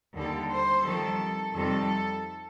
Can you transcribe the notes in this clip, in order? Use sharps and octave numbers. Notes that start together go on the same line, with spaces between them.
D#2 D3 G3 A4
C5
F2 D#3 G3 A4
F2 C3 D#3 G3 A4